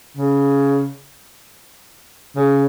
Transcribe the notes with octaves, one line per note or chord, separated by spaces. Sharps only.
C#3
C#3